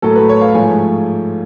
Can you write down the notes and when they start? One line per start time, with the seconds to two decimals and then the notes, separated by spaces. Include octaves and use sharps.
0.02 A2 F#3 A3 A4
0.16 B4
0.29 C#5
0.41 F5
0.54 G#2 F3 A3 G#5